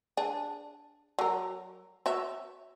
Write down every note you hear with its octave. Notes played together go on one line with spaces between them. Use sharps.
D4 G#4
F#3 A#4
F#4 C#5 E5